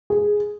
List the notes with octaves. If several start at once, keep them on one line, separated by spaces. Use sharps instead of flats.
G#4